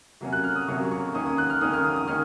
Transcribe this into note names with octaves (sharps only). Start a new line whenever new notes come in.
C3 F#3 A#3 C#4
F#6
F6
D#6
C3 F#3 A#3 C#4 C#6
C#6
D#3 A#3 C#4 D#6
D#6
F#6
F6
D#3 A#3 C#4 D#6
F6
D#6
D#6
D#3 A#3 C#4 F6